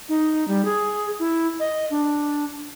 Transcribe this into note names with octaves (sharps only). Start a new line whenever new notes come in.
D#4
G3
G#4
E4
D#5
D4